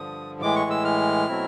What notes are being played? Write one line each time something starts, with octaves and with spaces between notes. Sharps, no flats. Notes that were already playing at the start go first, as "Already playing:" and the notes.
Already playing: G2 D3 F3 D#6
A2 E3 G#3 D6
C#6
E6
F6
B2 F#3 A3 C4 E4